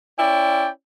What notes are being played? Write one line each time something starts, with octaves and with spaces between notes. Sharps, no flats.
C#4 E4 D5 G5